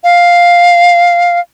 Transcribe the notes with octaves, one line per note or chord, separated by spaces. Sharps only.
F5